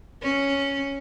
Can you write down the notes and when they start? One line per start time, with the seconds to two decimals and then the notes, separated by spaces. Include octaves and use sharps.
0.22 C#4